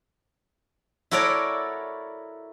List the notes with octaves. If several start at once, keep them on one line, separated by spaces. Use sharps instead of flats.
E4 F#4 A4 A#4 C#5 D5